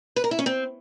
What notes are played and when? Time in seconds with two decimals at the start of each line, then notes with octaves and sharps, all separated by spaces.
0.16 B4
0.24 A#4
0.31 E4
0.39 C#4
0.46 C4